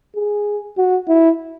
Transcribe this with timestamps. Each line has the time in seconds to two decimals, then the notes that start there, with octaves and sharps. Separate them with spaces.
0.16 G#4
0.77 F#4
1.08 E4